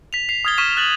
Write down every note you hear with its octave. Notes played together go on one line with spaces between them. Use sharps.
B6 F7
B6 C7 F7
D#6 F6 G#6 A6 G7
C#6 F6 B6 D#7 E7
F#6 A6 F#7